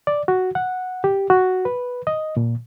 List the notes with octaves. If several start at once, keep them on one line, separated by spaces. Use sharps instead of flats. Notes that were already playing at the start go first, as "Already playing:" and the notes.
D5
F#4
F#5
G4
F#4
B4
D#5
A#2